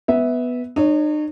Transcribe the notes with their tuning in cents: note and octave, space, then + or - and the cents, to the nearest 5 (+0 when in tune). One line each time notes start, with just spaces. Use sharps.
B3 +0 E5 -15
D#4 -45 C#5 +0